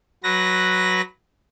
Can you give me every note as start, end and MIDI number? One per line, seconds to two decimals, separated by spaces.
0.24 1.01 54
0.24 1.01 71
0.24 1.01 94